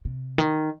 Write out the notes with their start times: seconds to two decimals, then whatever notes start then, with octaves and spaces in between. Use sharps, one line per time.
0.05 C3
0.38 D#3